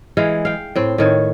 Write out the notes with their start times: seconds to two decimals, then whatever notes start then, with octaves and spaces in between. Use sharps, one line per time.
0.17 E3 G#3 F5
0.45 F5 G5
0.75 A2 C4
0.98 A2 D#3 C#5